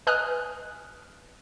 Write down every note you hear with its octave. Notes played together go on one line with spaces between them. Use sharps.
B4 D#5 G#5 D#6 F6 F#6